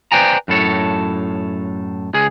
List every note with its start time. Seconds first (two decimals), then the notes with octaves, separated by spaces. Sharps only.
0.12 B4 C5 D5 G5 G#5 A#5
0.48 F#2 A2 A4 C#5
2.14 C#2 G#4